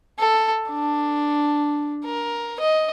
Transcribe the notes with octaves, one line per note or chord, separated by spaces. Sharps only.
A4
D4
A#4
D#5